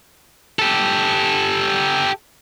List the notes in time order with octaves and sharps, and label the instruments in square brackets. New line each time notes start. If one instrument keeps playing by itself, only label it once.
[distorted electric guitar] G4 A4